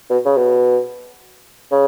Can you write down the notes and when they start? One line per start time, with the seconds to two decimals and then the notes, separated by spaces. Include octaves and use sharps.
0.10 B2
0.25 C#3
0.37 B2
1.71 C#3